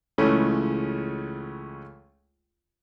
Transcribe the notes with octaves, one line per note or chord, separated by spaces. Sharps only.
C#2 C#3 E3 G#3 A3 C#4